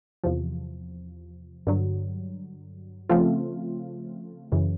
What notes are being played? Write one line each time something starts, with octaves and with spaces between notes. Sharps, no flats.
E2 C3 F3
G2 D3 F#3
C#3 F3 A3 C4 F4
F#2 C#3 E3